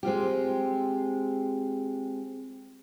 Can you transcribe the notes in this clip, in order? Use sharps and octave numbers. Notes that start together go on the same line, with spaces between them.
G#3 C4 F4 G4